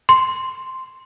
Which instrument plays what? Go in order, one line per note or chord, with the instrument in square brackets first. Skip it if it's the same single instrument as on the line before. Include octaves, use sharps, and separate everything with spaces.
[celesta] C6